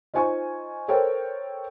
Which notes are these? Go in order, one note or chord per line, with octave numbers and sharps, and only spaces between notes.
D#4 F4 C5 G#5 C#6
A4 A#4 C5 C#5 G5